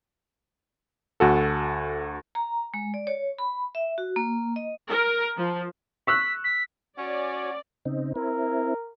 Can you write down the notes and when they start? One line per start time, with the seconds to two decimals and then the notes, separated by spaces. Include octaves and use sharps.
1.20 D2 F#4 A4
2.35 A#5
2.74 G#3
2.94 D5
3.07 C#5
3.39 B5
3.75 E5
3.98 F#4
4.16 A#3
4.56 D#5
4.89 A#4
5.37 F3
6.07 C#6 E6 F#6 B6
6.44 B6
6.98 C#4 F#4 C#5 D5 G#5
7.85 C#3 C4 D#4
8.16 C4 E4 A#4